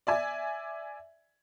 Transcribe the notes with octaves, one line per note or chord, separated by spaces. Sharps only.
D5 E5 G#5